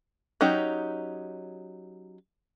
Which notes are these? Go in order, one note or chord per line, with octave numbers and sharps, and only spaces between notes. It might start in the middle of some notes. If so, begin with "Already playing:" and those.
F#3 C#4 D#4 G4